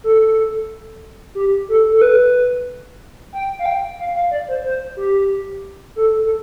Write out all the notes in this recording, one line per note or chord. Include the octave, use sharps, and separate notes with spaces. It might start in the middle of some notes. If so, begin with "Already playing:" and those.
A4
G4
A4
A4
B4
G5
F5
G5
F5
F5
D5
C5
C5
G4
A4
A4